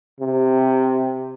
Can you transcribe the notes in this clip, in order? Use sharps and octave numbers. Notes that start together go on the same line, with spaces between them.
C3